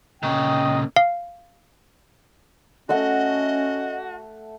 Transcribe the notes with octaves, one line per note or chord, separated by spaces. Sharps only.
A#2 C#3 D#5 G5
F5
A3 C#4 F#4 D#5 E5 F#5